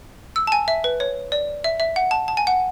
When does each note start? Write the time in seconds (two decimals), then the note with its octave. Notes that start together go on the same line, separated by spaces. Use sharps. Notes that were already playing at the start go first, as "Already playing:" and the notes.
0.36 E6
0.47 A5
0.52 G#5
0.68 E5
0.84 B4
1.00 C#5
1.32 D5
1.64 E5
1.80 E5
1.96 F#5
2.11 A5
2.28 A5
2.37 G#5
2.47 F#5